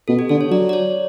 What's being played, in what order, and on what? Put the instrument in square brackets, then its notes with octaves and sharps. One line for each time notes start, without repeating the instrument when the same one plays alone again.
[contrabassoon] B2 [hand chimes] A4
[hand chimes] G4
[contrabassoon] D3 [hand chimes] A4
[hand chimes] C#5
[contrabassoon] F#3 [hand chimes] D5
[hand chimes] D5
C#5